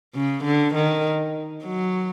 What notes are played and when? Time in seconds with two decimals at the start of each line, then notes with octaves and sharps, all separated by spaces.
0.15 C#3
0.45 D3
0.74 D#3
1.65 F#3